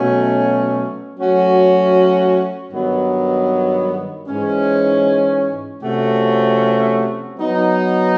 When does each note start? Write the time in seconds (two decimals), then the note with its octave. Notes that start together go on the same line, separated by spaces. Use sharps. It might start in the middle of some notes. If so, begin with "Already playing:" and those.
Already playing: B2 F#3 A3 C#4
1.17 F#3 A3 C#4 F#4
2.73 G2 D#3 F#3 B3
4.27 G#2 E3 G#3 C#4
5.82 C3 F3 A3 C#4 F#4
7.37 F#3 B3 D#4